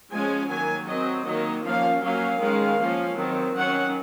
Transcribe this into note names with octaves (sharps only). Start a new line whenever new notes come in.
F3 G#3 C#4 G#5
D#3 F#3 A#3 G#5
F#3 C4 D#5
D#3 F#3 A#3 D#5
F3 A#3 C#4 F5
F#3 A#3 C#4 F5
D#3 G#3 C#4
F3 A#3 C#4
D#3 F#3 C4
D#3 F#3 C#4 F#5